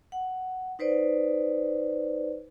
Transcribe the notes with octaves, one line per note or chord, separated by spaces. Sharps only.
F#5
D#4 B4 C5 D5